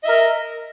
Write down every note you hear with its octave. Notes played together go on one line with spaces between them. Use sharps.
A#4 D#5 E5